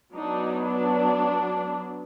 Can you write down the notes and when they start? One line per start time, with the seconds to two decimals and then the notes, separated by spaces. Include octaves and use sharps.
0.13 F#3 B3 D4 D#4
0.65 D4